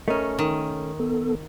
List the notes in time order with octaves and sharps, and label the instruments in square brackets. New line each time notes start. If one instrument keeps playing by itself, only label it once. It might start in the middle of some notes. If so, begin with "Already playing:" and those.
[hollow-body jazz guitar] A3 C#4 [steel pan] A#4 D#5
[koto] D#3
[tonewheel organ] B3 A4